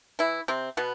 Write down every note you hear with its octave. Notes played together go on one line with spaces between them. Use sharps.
E3 E4
C3 C4
B2 B3